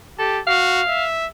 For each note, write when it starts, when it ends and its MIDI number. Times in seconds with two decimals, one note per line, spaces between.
0.19 0.40 67
0.19 0.39 69
0.47 0.82 66
0.47 1.05 77
0.87 1.26 76